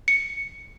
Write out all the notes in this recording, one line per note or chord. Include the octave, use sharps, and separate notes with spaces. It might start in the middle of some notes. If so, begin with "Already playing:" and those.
C#7